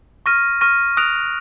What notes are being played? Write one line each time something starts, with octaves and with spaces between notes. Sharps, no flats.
C#6 F6 A#6 D#7
C#6 F6 A#6 D#7
D#6 F#6 A#6 D7 F7